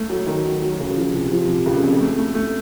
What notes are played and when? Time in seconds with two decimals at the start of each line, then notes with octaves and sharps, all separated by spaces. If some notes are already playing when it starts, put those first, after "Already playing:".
Already playing: A3
0.10 F#3
0.27 D#3
0.45 F#3
0.62 F#3
0.80 C#2
0.96 F3
1.13 C3
1.31 F3
1.48 C3
1.66 C#2
1.83 F2
2.00 A3
2.18 A3
2.35 A3